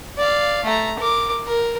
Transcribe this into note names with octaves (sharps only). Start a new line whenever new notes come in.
D5 F5
A3 A#5
A#4 D6
A#4